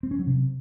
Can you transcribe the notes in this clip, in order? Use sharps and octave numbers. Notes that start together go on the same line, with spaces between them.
C4
C#4
F#3
C3